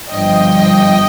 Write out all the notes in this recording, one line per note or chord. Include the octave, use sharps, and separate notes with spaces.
G1 G2 F3 D#5 G5